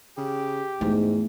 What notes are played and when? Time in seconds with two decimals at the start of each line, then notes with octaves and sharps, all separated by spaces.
0.17 C#3 G4
0.81 E2 G#2 A3